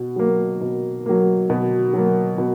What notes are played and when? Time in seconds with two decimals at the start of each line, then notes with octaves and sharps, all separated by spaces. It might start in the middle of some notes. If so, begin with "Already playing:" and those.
Already playing: B2
0.16 F#3 A#3
0.61 B2
1.06 F#3 A#3
1.50 B2
1.93 F#3 A#3
2.38 B2